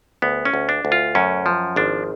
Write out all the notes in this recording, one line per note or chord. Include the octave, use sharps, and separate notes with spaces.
D2 B3
C#4
D2
D4
D2
F4
F#2 C#4
F3
G#1 D4